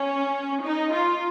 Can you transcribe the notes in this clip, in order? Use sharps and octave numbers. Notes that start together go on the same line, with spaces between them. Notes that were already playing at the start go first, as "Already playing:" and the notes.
Already playing: C#4
D#4
F4